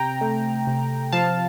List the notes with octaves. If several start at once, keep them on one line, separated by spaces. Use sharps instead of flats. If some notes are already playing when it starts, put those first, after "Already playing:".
Already playing: C3 G5 A#5
A3
C3
F3 F5 A5